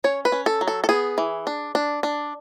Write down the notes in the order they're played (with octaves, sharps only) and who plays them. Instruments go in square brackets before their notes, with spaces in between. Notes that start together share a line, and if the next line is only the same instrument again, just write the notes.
[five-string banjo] C#4 C#5
B4
C#4
A4
F#3
A4
A4
B3 G#4
E3
D4
D4
D4